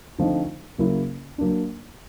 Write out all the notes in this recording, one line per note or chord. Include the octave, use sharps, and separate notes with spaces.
D3 F3 A3 C4 D#4
C#3 F#3 A#3 C#4 E4
F#3 A#3 D4